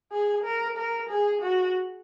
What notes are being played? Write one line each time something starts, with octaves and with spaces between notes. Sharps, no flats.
G#4
A#4
A#4
G#4
F#4